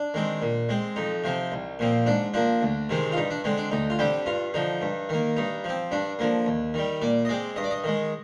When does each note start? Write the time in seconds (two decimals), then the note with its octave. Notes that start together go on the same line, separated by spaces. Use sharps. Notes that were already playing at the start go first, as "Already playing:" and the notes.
Already playing: D4
0.14 D#3 G#3 C4
0.42 A#2
0.69 G#3 C4
0.96 F2 D#4
1.24 C3 F3 C4
1.52 C2
1.79 A#2 F3 C4
2.06 G#2 D4
2.34 F3 A#3 D4
2.62 D2
2.89 C3 D#3 G#3 C4
3.12 F4
3.17 G2 D#4
3.30 D4
3.44 D3 G#3 C4
3.57 D4
3.72 D2 D#4
3.90 F4
3.99 D3 G3 C4 G4
4.26 G2 F4
4.54 D3 F3 D#4
4.81 G2
5.09 D#3 A#3
5.36 G2 D#4
5.64 F3 C4
5.91 G2 D4
6.19 D3 F3 A#3
6.46 D#2
6.74 D#3 G3
7.02 A#2 D5
7.25 D#5
7.29 G#3 C4 D5
7.56 G2 D#5
7.64 D5
7.71 D#5
7.84 D#3 G#3